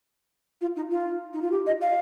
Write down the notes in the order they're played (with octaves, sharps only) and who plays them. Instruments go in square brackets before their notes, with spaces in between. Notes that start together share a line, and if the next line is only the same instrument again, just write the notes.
[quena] F4
D#4
F4
D#4
F4
G4
D#5
F5